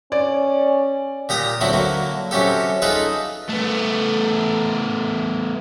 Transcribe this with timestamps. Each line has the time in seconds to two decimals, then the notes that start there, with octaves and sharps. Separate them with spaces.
0.12 C#4 D5
1.29 A#2 G4 A#5 D#6
1.61 D3 F#3 C4 E4
1.73 D3 F#3 A#3
2.31 C3 F#3 C#4 G4 A4
2.82 D#4 F4 G#4 A4 B4
3.49 A3 B3